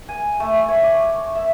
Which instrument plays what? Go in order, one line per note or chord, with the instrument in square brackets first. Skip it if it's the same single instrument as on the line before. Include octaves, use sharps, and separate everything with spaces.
[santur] G#5
A3
C#5
D5
E5